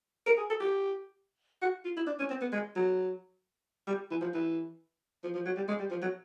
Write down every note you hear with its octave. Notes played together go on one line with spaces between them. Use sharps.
A#4
G#4
A4
G4
F#4
F4
E4
D4
C#4
C4
B3
G#3
F#3
G3
E3
F3
E3
F3
F3
F#3
G3
G#3
G3
F3
F#3